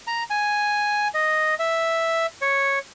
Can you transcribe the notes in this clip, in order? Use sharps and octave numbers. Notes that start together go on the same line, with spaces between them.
A#5
G#5
D#5
E5
C#5